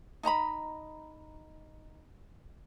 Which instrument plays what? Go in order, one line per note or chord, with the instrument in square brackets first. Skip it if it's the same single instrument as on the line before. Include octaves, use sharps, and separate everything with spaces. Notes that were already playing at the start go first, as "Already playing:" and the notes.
[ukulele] D#4 D#5 A#5 B5